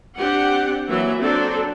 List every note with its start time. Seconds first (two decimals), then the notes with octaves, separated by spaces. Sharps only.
0.19 C4 D4 G4 F#5
0.88 E3 F#3 A#3 E5
1.19 F#3 C4 D4 A4 D5